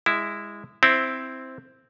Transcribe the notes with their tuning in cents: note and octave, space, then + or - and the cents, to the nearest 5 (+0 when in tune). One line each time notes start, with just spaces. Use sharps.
G#3 -20 E4 +0
C4 +0 E4 +0